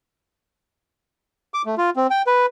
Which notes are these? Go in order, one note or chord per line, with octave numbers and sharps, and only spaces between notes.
D6
A3
F4
C4
G5
B4